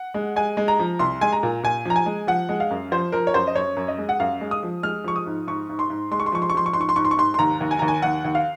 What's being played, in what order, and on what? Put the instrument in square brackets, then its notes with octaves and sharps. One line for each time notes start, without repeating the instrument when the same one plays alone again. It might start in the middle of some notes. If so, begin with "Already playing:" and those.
Already playing: [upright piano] F#5
G#3
G#3 G#5
G#3
A#5
F3
C2 C6
G#3 G#5
A#5
A#2
A#2 G#5
F3 A#5
G#5
G#3
F3 F#5
G#3
F5
F#2
F3 C5
F3 A#4
C#5
F#2 C5
D#5
F#2 C#5
F#2
D#5
G#3
F#5
F#2 F5
G#3
D#6
F3
G#3 F6
F3 C#6
D#6
G#2
G#2 C#6
G#2
C6
G#2
G#3 C6
C#6
C6
F3 C#6
C6
C#6
F3 C6
C#6
G#2 C6
C#6
C6
G#2 C#6
C6
C#6
G#2 C6
C6
D#2 A#5
D#2
G#5
D#2 A#5
G#5
D#2 F#5
D#2
F5